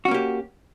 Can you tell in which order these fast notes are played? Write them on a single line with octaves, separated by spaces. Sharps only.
F#4 C#4 A#3 G4